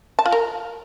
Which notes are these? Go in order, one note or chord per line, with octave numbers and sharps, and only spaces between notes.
A5
F4
A#4